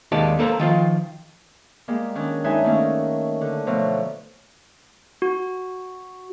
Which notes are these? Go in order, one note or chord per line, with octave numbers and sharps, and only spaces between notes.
D#2 D#3 G#3 G4 D5 A5
A#3 A4 B4 C5 A#5
D#3 F3 F4
G3 G#3 A#3
D#3 C#4 D4
G2 F#3 G#3 D#4 E5 G#5
D#3 A3 A#3 C#4
D3
B2 F3 F#3 A3
F#4